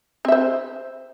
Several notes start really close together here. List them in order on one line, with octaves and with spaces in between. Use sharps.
C4 E5 C5